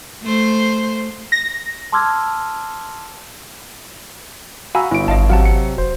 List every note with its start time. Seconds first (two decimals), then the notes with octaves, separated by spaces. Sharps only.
0.22 A3 C5
1.32 A#6
1.92 A5 C6 D6 E6 F6 G#6
4.75 F#4 F5 G#5 A#5 B5 E6
4.91 G1 E4 D7
5.08 G#1 D#5 F5 A5
5.30 C3 F#3 F5 F#5 A5
5.45 C#7
5.78 F1 C5